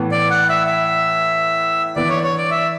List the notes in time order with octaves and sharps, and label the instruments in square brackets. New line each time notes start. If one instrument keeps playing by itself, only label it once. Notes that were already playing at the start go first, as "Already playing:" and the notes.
Already playing: [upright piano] A2 E3 B3
[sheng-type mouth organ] D5
F#5
E5
E5
[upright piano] E3 B3 D4 [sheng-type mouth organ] D5
[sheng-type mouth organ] C#5
C#5
D5
E5